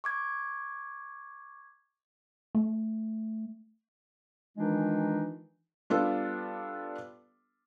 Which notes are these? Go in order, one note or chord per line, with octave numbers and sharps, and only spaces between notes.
C#6 D6 G#6
A3
D#3 E3 G#3 D4 D#4 F4
G3 B3 D4 F4 A4